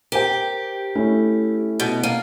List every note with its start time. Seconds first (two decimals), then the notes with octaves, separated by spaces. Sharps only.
0.12 G4 A#4 C5 G5
0.95 A3 C#4 E4
1.80 B2
2.03 A#3